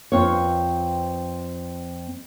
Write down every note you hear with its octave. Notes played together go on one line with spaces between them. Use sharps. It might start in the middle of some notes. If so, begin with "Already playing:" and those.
F2 C4 F4 B4 C#5